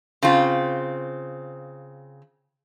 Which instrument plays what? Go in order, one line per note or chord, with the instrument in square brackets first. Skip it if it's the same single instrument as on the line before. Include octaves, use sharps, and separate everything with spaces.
[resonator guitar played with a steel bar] C#3 C4 F4